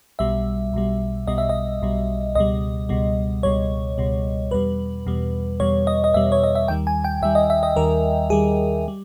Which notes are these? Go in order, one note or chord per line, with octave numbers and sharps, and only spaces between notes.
B1 B2 G3 E5
B1 B2 G3
B1 B2 G3 D#5
E5
D#5
B1 B2 G3
C#2 B2 G3 D#5
C#2 B2 G3
C#2 B2 G3 C#5
C#2 B2 G3
E2 B2 G3 B4
E2 B2 G3
E2 B2 G3 C#5
D#5
D#5
E2 B2 G3 E5
C#5
D#5
E5
D#2 D#3 G3 G5
G#5
G5
D#2 D#3 G3 E5
D#5
E5
D#5
D#2 D#3 G3 A#4
D#2 D#3 G3 G#4
G3